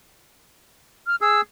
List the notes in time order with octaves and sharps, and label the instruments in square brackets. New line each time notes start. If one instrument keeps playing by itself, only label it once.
[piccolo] F6
[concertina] G#4 [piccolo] E6